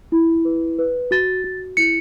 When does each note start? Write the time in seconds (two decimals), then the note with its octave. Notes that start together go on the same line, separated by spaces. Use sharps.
0.12 E4
0.45 B4
0.79 B4
1.11 F#4 A6
1.44 F#4
1.77 E4 C#7